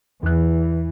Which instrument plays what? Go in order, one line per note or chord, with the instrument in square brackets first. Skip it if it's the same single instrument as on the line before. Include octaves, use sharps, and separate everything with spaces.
[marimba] E2 F#6 [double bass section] E3